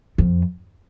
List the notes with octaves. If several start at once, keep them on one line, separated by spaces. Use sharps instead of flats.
F2